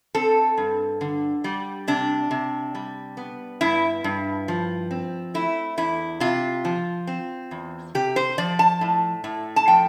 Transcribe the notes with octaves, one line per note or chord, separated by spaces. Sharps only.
C4 A4
G2
D3
G3
C3 D4
C3
G3
B3
G2 E4
G2
F3
C4
A3 E4
E2 E4
C3 F4
F3
C4
E2
C3 G4
C5
F3 D5
A5
A2
A2
A5
F3 G5